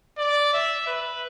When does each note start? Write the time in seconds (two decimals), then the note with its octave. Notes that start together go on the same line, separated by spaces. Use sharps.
0.18 D5
0.54 E5
0.87 B4